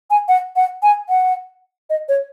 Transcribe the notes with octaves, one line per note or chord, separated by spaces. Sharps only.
G#5
F#5
F#5
G#5
F#5
D#5
C#5